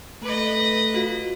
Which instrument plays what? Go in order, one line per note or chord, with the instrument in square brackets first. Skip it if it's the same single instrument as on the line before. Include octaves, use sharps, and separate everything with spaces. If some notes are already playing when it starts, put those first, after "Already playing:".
[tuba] A3 [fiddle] B4 D#5
[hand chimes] F4 F#4